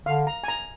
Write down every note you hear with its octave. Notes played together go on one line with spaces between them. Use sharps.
D3 F5
A#5
G#5
A#5